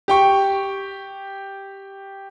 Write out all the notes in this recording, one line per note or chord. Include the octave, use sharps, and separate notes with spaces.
G4 G5 C#6